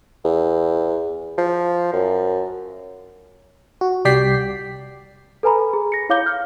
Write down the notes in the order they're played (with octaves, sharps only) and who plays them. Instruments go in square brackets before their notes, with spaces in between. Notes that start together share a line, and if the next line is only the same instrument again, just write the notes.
[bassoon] E2
F3
F#2
[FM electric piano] F#4
C2 G3 D5 G5 B6 C7
[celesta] A4 B4 G#5 A#5 B5
G#4
A#6 C#7
E4 C#5 F5 D6 G6 G7
F6